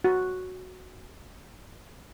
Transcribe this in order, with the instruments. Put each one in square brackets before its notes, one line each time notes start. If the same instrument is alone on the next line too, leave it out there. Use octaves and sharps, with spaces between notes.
[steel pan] F#4